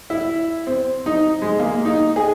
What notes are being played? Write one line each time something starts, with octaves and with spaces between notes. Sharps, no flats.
E4
C4
D#4
G#3
A#3
D#4
G#4